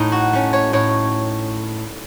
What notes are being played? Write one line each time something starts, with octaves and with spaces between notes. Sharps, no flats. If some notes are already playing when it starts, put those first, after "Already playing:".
Already playing: A2 D#4
F#4
A3 C#4
C#5
A2 C#5